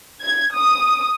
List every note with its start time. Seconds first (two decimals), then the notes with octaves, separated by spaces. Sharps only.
0.24 G#6
0.56 D#6